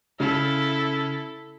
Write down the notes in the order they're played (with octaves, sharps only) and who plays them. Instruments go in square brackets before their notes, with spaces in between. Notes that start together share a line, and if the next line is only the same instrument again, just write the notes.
[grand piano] C#3 [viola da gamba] E4 A4